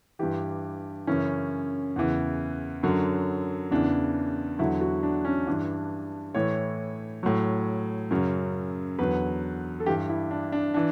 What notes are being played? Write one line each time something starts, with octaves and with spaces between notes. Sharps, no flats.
G2 E3 G4
F#2 C#3 E3 C#4
E2 C#3 E3
F#2 D3 F#3
E2 C#3 E3 D4
E2 D3 F#3 E4
F#4
D4
C#4
G2 E3 D4
A2 E3 C#5
A2 F#3
F#2 C#3 F#3
E2 D3 F#3 B4
A4
G2 E3 G4
E4
D4
D4
E3 D4